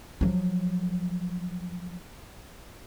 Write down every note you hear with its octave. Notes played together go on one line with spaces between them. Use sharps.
F3 F#3